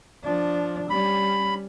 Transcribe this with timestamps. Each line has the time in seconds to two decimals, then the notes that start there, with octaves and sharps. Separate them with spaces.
0.24 F3 D4
0.90 G3 C#4 B5